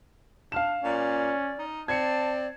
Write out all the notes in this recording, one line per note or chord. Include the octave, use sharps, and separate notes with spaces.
D4 F5 F6 E7
A#2 C#4 D5
D#4
C4 D5 A5 G#6 C#7